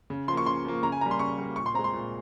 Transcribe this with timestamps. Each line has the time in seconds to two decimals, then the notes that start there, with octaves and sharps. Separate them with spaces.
0.10 C#3
0.28 F3 C6
0.32 A#3 C#6
0.46 C#3 C6
0.65 F3 A#3
0.83 C#3 A#5
0.92 G#5
1.01 G3 A#3 A#5
1.11 C6
1.19 C#3 C#6
1.38 G3 A#3
1.56 A#2 C#6
1.66 C6
1.74 C4 A#5
1.79 G#3
1.84 C6
1.93 A#2